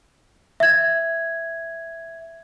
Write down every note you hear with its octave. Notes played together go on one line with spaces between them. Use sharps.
E5 G#6